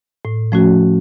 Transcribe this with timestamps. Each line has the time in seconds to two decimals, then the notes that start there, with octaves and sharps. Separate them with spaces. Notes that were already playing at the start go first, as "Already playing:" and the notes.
0.25 A2
0.52 F3 A3 C#4 F#4